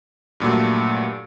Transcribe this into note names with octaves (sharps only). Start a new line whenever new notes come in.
G2 A#2 F#3 A3